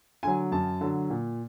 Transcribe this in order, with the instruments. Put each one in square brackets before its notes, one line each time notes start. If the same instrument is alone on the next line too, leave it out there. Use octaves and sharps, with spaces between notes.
[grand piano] D3 F#3 G#5
F#2 A5
D3 F#3
A#2